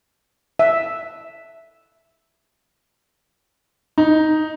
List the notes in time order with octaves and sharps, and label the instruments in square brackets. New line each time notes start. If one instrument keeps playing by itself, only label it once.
[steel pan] E5
[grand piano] D#4